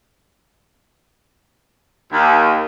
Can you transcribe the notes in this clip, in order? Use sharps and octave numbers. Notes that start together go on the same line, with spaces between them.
D#2